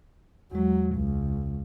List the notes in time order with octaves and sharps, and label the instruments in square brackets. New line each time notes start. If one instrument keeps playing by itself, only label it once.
[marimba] E2 G#3 [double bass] F#3
[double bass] C#2